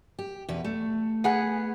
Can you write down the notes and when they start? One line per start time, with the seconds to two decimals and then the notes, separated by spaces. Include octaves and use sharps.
0.19 G4
0.49 E2 B2 B4
0.65 A3
1.24 B3 G#4 F#5